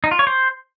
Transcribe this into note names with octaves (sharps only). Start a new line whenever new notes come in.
D#4
F4
C#5
C5